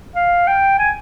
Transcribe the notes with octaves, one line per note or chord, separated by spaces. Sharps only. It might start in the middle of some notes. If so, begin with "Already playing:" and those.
F5
G5
G#5